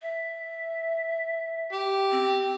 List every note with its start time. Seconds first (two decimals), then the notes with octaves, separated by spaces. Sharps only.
0.02 E5
1.73 G4
2.12 C4